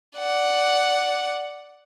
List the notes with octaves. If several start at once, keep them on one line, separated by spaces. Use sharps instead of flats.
D5 F#5